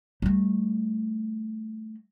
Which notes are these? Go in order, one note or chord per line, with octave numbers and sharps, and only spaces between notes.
G3 A3